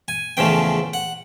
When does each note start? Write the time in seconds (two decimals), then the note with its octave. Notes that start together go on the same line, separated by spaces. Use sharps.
0.08 G#5
0.37 E2 C#3 F3 A3 G5
0.94 F#5